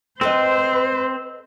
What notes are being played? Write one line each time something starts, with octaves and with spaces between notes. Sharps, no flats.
C4 A4 B4 C5 D#5